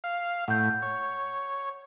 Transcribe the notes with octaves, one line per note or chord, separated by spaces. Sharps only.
F5
A2 F#5 G6
C#5